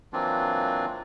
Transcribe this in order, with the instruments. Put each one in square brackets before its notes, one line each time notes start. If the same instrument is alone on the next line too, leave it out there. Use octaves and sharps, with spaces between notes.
[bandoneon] E3 F#3 A#3 C4 D4 F4